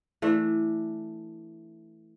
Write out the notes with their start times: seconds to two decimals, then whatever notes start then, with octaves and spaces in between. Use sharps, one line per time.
0.22 E3 A3 D4